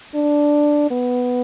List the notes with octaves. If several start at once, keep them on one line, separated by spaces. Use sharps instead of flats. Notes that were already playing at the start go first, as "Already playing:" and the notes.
D4
B3